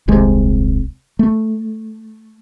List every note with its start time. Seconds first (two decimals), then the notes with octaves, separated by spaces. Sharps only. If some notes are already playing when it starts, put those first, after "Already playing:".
0.08 D#1 C2 C3 G#3
1.19 A3